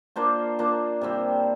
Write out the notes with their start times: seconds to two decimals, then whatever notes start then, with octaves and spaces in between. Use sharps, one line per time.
0.16 A#3 D4 F4 C5
0.59 A#3 D4 F4 C5
1.01 C3 G3 C4